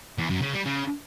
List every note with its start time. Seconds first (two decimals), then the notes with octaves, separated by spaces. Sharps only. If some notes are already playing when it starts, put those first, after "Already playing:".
0.18 E2
0.30 F#2
0.42 C#3
0.54 G3
0.66 C#3